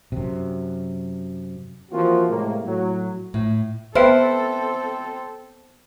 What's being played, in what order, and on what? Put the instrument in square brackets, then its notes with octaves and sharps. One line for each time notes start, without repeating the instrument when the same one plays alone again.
[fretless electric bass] F#2 C3
[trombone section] E3 F3 A#3 C4 F4 F#4
A2 C3 G#3 A#3
A2 F#3
[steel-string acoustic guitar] A2
[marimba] B3 G5 F6 [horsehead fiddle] C4 A4 [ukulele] B4 E5 [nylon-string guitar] C5